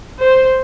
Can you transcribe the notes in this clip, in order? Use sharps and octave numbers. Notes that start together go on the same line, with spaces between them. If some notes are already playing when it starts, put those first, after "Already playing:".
C5